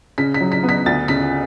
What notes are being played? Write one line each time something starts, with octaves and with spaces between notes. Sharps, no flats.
C#3 B6
B6
F#3
B6
B3
B6
D2 A6
C#3 B6